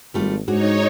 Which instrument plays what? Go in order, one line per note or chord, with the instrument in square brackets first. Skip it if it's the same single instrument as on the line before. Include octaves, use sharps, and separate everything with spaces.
[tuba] G#1 [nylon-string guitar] G3 A3 F4
[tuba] G#2 [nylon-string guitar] D4 F#4 G#4 [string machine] D#4 C#5